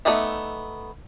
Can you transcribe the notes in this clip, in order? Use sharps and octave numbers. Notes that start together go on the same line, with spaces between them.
A3 B3 D#4 D5 E5